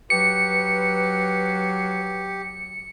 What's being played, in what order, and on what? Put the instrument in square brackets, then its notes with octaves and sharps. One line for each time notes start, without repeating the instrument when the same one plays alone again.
[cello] F#3 [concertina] G4 [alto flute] B4 [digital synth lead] C#7